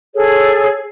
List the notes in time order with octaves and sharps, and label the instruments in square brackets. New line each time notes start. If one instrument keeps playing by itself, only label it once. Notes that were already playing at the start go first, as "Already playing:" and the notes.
[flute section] G#4 A4 C#5